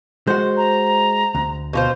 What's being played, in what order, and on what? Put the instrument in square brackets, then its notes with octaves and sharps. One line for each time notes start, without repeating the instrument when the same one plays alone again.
[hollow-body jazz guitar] G#3 F#4 [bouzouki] C5
[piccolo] A#5
[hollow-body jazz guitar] D2
[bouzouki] B2 F4 C5